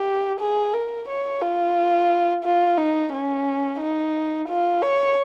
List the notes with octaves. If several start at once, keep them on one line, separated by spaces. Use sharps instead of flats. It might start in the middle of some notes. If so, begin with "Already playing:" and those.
Already playing: G4
G#4
A#4
C#5
F4
F4
D#4
C#4
D#4
F4
C#5